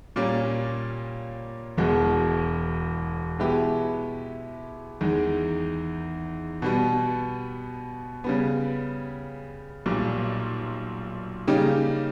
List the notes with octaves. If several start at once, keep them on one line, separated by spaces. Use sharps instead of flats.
A#2 G3 A#3 C#4
E1 E2 B2 G#3
B2 G#3 B3 E4 G4
E2 D#3 G#3
B2 G3 B3
C#3 G3 B3
B1 A#2 G3
C#3 G3 A#3 D#4 G4